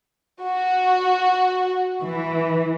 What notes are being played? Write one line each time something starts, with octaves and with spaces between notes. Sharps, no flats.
F#4
E3